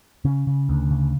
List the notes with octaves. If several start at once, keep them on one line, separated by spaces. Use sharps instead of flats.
C#3 C#4
C#3
D2
C#3